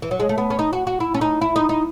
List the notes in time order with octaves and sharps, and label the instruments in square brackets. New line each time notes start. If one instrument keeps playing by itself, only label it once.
[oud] E3
F#3
G#3
A3
B3
C#4
D#4
F#4
F#4
E4
C#4
D#4
E4
D#4
D#4